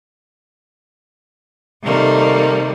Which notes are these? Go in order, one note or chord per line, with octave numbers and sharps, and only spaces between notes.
C3 D#3 G3 A3 A#3